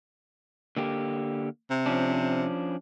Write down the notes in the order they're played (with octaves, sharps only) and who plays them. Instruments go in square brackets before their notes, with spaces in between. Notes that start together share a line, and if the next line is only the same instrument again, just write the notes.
[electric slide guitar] D3 A#3 G4
[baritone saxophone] C3
[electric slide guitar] F3 C#4 D4